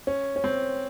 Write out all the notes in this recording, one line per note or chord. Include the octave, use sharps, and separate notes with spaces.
C#4
C#4
C4